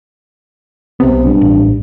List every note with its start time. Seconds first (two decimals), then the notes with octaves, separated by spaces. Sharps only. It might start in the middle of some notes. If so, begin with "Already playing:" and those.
1.00 B1 C3 B3
1.25 G2
1.41 A1